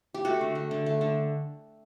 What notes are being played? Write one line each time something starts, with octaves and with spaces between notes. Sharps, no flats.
G4
A3 F#4
D3
A3
D3
A3
D3